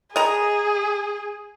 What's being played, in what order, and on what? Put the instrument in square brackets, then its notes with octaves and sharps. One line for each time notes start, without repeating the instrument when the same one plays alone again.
[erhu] G#4 [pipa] D#5 A#5